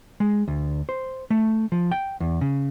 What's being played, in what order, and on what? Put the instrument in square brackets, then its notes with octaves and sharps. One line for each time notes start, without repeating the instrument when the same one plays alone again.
[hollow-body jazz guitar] G#3
D2
C5
A3
F3
G5
E2
C#3